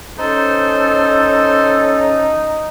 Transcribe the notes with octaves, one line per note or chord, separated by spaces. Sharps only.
C#4 D#4 A4 C5